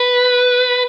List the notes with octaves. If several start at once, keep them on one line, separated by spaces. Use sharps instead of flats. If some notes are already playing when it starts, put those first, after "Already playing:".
Already playing: B4